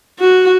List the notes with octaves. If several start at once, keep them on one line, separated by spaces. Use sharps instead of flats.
F#4